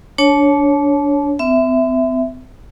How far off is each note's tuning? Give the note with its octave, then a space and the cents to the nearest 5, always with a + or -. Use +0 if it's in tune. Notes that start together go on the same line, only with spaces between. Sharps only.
D4 -20 C#5 +0 A5 -30
C4 -45 E5 +0